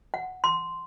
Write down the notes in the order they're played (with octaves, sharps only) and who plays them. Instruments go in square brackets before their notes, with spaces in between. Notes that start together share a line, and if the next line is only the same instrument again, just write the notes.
[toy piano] F#5
C6